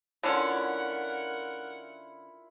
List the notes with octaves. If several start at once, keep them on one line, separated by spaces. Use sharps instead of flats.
D3 C#4 E4 F4 A#4 F#5